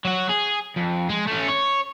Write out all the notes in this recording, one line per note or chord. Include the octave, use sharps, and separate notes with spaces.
F#3 F#4
G#4
F2
G#3
A3 C#4
C#5